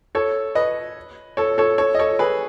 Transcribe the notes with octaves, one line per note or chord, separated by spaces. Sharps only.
A4 C#5
B4 D#5
A4 C#5
A4 C#5
A4 C#5
D#5
A4 C#5
G#4 B4